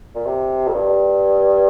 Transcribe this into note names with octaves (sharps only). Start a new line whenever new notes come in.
A#2
C3
F2
G2